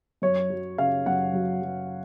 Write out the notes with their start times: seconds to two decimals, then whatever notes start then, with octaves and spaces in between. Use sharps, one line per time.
0.22 F#2 C#5
0.50 F#3
0.78 C#3 F5
1.06 F#2 F#5
1.33 F#3
1.62 F#3